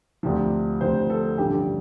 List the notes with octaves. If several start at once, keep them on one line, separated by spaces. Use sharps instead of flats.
D2 C3 F3
D2 C3 F3 C5
A4
A1 G2 D3 F3 G4